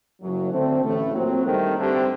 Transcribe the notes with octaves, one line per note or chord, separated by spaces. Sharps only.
F#1 F#2 F#3
D3 A3 C4
A1 A2 A3
A#2 F#3 C4
G2 D#3 A3
G2 D3 A3 C4 G4